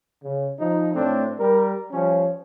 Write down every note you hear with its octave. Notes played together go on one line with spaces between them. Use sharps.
C#3
F3 D#4
A2 A3 C4 D4
G3 A#4
F3 G3 C#4